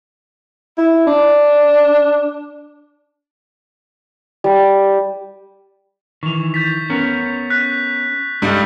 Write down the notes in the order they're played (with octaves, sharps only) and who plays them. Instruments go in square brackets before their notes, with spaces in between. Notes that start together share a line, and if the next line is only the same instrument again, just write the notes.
[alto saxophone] E4
D4
[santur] G3
[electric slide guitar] D#3 E3 [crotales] C#6 F7
[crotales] G6 A6 B6
[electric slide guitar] B3 C#4 A#4
[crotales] F#6 B6
[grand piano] G2 G3 [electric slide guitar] G#3 D#4 A4